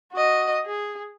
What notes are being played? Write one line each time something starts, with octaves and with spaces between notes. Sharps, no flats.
F#4 D#5
G#4